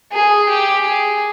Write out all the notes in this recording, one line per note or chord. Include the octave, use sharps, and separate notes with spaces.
G#4
G4
G#4